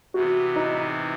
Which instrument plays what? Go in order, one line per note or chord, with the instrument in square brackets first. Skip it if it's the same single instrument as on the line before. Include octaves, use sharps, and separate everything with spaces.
[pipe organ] C3 E3 B3 [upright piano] F#4
[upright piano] D#4